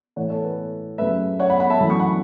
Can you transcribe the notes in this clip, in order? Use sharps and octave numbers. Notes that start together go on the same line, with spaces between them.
A2 E3 A3 C#5 F#5
A4 C#5
B4
F#2 C#3 A3 B4 E5
C#5 F#5
F#5 B5
F#5 B5
E5 A5
F#2 E3 A3 B5
C#6
F#5 B5